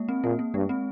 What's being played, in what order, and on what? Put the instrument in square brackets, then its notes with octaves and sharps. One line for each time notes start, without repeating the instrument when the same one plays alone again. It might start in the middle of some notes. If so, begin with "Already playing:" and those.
Already playing: [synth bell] G#3 A#3
C4
[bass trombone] A#2 [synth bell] A#3
[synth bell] A#3
[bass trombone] G2 [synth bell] G#3
[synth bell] C4